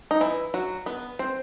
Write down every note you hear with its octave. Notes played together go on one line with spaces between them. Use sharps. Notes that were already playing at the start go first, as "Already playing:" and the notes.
D#4
E3 E4
F#3 F#4
B3 B4
C4 C5